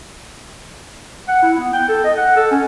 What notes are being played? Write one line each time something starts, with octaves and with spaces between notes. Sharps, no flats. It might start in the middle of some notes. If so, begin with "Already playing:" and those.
F#5
E4
B3
G5
A4
D#5
F#5
A4
C#4